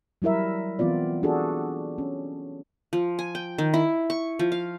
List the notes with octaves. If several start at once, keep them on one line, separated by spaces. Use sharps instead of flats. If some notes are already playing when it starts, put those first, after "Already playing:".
F#3 G3 E4 A#4 E5
E3 B3 C4 F4 D5
D4 F#4 G#4 A4
C#4
F3
G#5
G5
D#3
E4
C#6
F3
F5